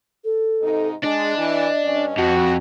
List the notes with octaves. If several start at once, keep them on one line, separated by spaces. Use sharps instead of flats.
A4
G#2 C3 D#4
G#3 D4 D#5
E3
G2 C#4
F2 F#4